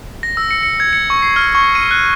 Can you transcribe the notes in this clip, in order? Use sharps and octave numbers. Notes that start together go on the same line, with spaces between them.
A#6
E6
C#7
C#7
G#6
C#7
C#6
C7
F6
C#6
D#7
F#6